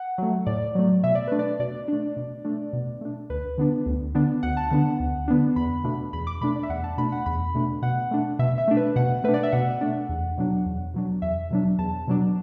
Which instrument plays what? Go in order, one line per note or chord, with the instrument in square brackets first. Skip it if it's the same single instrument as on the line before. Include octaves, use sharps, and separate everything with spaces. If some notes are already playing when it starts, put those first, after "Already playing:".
Already playing: [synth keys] F#5
F#3 A3
A2 D5
F#3 A3
B2 E5
D5
A3 D4 B4
D5
B2 D5
A3 D4
B2
A3 D4
B2
A3 D4
D2 B4
D3 B3 D4
D2
D3 B3 D4
D2 F#5
A5
D3 B3 D4 F#5
D2
D3 B3 D4
E2 B5
B2 A3 D4
E2 B5
D6
B2 A3 D4 B5
D5
E5
E2 F#5
A5
B2 A3 D4 B5
F#5
E2 B5
B2 A3 D4
B2 F#5
A3 D4
B2 E5
E5
A3 D4
B4
B2 F#5
A3 D4 B4
D5
E5
B2 F#5
A3 D4
E2
B2 F#3 D4
E2
B2 F#3 D4
E2 E5
B2 F#3 D4
E2 A5
B2 F#3 D4